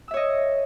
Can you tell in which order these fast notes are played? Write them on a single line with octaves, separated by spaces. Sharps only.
E6 E5 C#5 D#5